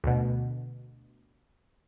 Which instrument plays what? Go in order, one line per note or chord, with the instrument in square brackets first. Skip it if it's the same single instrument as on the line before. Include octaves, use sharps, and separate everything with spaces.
[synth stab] D2 B2